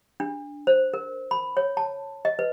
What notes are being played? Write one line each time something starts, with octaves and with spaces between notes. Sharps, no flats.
D4
C5
A#4
B5
C#5
A5
D#5
B4